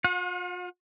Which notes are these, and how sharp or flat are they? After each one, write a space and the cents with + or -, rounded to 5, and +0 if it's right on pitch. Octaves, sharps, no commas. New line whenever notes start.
F4 +40 F#5 -35